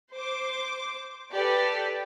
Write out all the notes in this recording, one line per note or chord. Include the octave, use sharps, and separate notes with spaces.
C5 D6
G4 A4 B4 D5